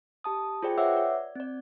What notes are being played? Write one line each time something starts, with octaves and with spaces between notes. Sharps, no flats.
G4 A5 D#6
F4 G#4 C5 D5 G5
B4 C#5 E5 F#5 D6 E6
D5
C4 D5